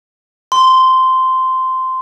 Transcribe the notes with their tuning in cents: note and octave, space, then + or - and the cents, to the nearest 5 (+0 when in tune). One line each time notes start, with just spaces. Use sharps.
C6 -10